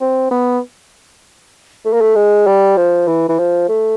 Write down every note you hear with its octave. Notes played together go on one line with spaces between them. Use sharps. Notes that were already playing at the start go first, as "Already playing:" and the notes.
C4
B3
A3
A#3
A3
G#3
G3
F3
E3
E3
F3
A3